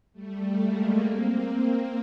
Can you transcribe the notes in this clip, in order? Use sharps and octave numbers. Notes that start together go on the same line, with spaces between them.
G3 A3
G#3 A#3
A#3 C4